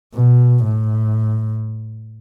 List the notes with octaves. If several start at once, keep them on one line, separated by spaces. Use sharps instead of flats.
B2
A2